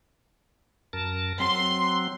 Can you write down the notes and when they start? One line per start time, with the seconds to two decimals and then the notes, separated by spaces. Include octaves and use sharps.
0.93 F#2 A#4 A5
1.40 F#3 C4 C6